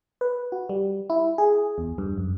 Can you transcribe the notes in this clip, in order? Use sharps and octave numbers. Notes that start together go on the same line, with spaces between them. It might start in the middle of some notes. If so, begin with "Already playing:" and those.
B4
F#4
G3
E4
G#4
E2
G2
F#2